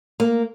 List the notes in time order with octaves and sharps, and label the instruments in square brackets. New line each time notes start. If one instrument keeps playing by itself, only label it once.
[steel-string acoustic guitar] A#3